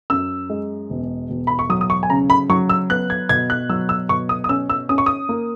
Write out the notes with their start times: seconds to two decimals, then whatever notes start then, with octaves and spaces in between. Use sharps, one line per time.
0.10 F#2 E6
0.50 G#3
0.90 E1
1.30 E1
1.47 B5
1.59 C#6
1.69 F#3 D#6
1.81 D#6
1.90 C#6
2.03 G#5
2.10 C#3 A#5
2.30 B5
2.50 F#3 C#6
2.69 E6
2.90 B3 F#6
3.10 G#6
3.29 B2 G#6
3.50 F#6
3.69 F#3 E6
3.89 E6
4.09 B2 C#6
4.29 D#6
4.44 D#6
4.49 C#4 E6
4.70 E6
4.89 C#4 D#6
4.98 C#6
5.06 D#6
5.29 A#3